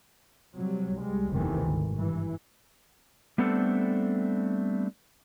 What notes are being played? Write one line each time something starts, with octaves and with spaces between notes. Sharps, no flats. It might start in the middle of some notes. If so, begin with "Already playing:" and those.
C3 F#3 G3
C2 G3 G#3
F#1 E2 C3 D#3 E3 A3
G#1 D2
G2 E3
G3 A3 B3 C4 D4 A4